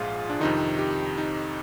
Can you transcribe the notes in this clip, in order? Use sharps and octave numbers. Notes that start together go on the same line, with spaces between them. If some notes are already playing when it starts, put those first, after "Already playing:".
Already playing: A#1 G#2 F4 G#4
D4
F2 C3 D#3 D#4
G4
D#4